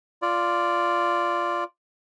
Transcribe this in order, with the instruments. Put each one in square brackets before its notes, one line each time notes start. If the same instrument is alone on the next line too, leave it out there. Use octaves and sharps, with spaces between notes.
[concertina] F4 D5